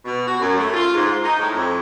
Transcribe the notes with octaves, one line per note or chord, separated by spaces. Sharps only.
B2
F#4
F#2
A3
F4
G#2
D#4
A2
F2